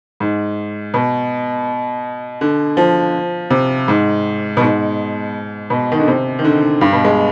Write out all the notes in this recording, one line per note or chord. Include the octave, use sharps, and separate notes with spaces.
G#2
B2
D3
F3
C3
G#2
B2
G#2
B2
D#3
D3
C3
D#3
D3
G2
B2
G#3